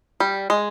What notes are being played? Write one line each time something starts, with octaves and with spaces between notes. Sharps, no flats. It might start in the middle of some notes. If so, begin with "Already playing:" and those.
G3
G#3